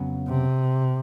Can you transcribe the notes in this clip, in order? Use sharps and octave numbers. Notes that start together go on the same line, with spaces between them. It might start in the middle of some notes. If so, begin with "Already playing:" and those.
Already playing: F2 C#3 F#3 B3
C3